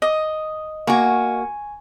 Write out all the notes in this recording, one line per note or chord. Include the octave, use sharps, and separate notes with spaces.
D#5
A#3 F#4 G#5 C#6